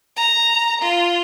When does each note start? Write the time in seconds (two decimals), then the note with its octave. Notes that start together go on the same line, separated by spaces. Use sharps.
0.16 A#5
0.81 F4